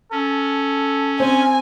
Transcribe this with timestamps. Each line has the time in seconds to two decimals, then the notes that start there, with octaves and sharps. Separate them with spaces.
0.12 C#4 A4
1.20 C4 G#5